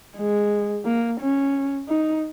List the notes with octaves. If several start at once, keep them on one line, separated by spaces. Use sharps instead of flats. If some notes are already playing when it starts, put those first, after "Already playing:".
G#3
A#3
C#4
D#4